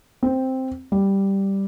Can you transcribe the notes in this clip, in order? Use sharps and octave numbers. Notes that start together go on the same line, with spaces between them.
C4
G3